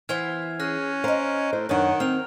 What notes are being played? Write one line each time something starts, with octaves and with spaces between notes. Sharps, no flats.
E3 B3 E4 C5 F6 G#6 F7
C#4 G#4 F6 F#6 A#6
C5 D#5 F5 A#5 D7
A2 C5
F#2 D#3 D4 B4 C#5 F#5
C4 C5 F6 F7